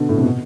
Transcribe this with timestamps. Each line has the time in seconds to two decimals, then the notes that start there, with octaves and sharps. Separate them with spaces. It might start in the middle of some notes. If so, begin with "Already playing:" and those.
Already playing: B2 D3
0.09 A2
0.17 C3
0.23 B2